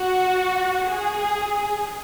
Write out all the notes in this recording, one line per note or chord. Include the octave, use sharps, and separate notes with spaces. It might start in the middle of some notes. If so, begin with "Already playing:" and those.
Already playing: F#4
G#4